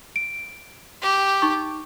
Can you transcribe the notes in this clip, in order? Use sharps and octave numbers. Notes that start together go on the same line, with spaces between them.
D7
G4
D#4 C#6